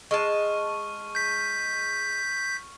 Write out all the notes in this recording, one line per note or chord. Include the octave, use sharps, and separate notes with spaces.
G#3 A5 C#6 F6
G6 B6